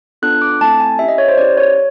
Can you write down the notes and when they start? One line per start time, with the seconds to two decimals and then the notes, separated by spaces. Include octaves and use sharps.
0.22 B3 D4 F4 A4 F#6
0.42 D6
0.61 A3 C4 E4 A4 A5
0.80 G#5
0.99 C#4 E4 G4 E5
1.08 D#5
1.18 C#5
1.28 C5
1.37 C#4 E4 G4 D5
1.57 C#5